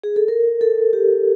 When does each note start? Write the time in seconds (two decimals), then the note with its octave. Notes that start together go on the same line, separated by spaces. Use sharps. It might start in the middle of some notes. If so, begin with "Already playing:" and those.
0.04 G#4
0.16 A4
0.28 A#4
0.61 A4
0.93 G4